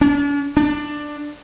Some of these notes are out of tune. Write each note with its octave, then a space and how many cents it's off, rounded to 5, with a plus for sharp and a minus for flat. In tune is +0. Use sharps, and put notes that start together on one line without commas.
D4 -45
D4 +10